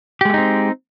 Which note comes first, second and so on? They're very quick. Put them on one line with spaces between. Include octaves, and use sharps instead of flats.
G4 G#3 A3 D#4 C4